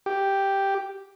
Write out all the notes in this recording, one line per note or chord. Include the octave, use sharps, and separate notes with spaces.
G4